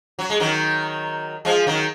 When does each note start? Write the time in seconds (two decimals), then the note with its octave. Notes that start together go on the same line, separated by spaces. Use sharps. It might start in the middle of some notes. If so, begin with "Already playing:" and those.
0.19 F#3
0.30 G#3
0.40 D#3 F#3
1.45 F3 G#3
1.67 D#3 F#3